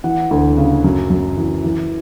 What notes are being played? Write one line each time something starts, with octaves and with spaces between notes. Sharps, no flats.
E3 F#5
D2
C#3
F#2
F#2
E3
E3